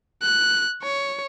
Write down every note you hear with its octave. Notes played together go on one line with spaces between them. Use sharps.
F#6
C#5